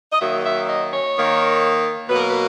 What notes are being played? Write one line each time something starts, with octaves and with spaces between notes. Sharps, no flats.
D#5
D#3 F#3 A#3 E5
E5
D#5
C#5
D#3 A#3
B2 F#3 A#3 B4
A#4
B4